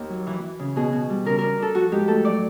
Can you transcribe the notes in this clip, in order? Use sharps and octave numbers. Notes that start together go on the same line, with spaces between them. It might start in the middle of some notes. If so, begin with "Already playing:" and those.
Already playing: D#2 D#3
F#3
E3
E3
C#3
B2 G#4
B2
G3
C#3 A#4
D4 A#4
D4 A4
F3 F#4
G#2 G4
A3 A4
F#3 D5